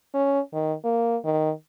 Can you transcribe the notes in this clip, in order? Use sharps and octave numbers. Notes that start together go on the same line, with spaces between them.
C#4
D#3
A#3
D#3